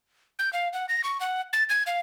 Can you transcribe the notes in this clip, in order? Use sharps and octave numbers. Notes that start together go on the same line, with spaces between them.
G6
F5
F#5
A#6
C#6
F#5
A6
G#6
F5